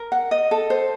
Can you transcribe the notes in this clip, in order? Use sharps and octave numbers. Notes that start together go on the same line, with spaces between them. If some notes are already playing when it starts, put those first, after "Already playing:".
Already playing: A#4
F#5
D#5
A4
C5